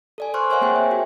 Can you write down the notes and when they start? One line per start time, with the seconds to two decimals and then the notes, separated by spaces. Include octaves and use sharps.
0.18 A4 D5 G#5
0.34 C5 C6 C#6 F6 F#6
0.50 A#4 C5 C#5 E5 F#5 G#5
0.61 A#3 C4 G#4 G5
0.76 E5
0.91 F#4